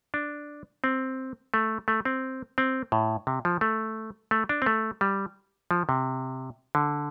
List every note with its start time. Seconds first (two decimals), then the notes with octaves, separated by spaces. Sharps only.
0.14 D4
0.84 C4
1.54 A3
1.88 A3
2.05 C4
2.58 C4
2.92 A2
3.27 C3
3.45 F3
3.61 A3
4.31 A3
4.49 D4
4.62 C4
4.66 A3
5.01 G3
5.71 F3
5.89 C3
6.75 D3